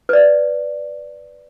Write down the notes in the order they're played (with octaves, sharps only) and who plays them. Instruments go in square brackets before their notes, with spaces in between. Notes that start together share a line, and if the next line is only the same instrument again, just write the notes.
[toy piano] B4 D5